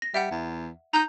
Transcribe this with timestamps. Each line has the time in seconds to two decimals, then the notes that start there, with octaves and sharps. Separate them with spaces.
0.02 A#6
0.14 G3 E5 F#5
0.31 E2
0.94 D#4 A#5 G6